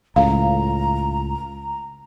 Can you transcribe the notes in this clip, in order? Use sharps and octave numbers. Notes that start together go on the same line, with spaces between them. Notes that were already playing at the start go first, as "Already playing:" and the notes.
C#2 A2 F5 A#5